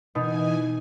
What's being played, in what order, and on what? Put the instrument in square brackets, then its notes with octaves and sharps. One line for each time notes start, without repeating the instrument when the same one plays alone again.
[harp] B2 D#4 [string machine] E3 G#5